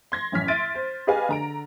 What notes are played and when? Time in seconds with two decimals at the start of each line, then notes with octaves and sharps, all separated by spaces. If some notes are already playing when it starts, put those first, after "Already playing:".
0.12 C6 G#6 A#6
0.32 A1 F#2 C#4 F6 B6
0.48 E5 C6 A6 D7 D#7
0.75 C5
1.07 G4 G#4 B4 D#5 F5 G#5
1.29 D3 A#5 D7